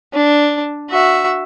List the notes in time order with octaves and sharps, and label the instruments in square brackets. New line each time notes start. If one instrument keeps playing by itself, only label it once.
[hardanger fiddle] D4
F#4 E5